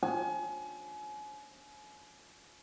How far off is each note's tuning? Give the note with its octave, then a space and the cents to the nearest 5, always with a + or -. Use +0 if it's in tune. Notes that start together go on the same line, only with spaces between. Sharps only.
G#5 +35